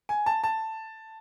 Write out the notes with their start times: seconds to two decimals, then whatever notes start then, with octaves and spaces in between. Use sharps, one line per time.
0.09 G#5
0.26 A5
0.44 A5